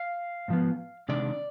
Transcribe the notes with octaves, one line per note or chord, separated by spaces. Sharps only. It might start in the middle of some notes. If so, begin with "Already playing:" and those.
Already playing: F5
G#2 F3 B3
C3 D#3 G#3 D4 D5